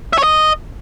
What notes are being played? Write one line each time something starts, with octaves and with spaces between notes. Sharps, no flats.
E5
C#5
D#5